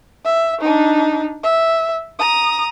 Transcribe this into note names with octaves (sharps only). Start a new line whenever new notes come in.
E5
D4 D#4
E5
A#5 D#6